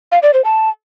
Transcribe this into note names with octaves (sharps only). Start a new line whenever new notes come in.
F5
D5
C5
A5